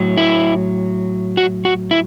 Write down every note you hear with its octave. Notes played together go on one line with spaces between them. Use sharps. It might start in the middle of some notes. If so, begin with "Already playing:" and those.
Already playing: A2 F#3
E4
F#4
F#4
E4